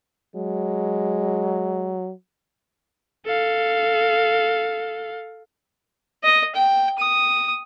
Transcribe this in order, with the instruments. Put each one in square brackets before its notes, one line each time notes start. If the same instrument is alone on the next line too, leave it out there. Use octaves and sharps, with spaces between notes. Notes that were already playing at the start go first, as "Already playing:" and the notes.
[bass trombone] F#3 [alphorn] G#3
[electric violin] A4 F5
[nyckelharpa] D#5
G5
D#6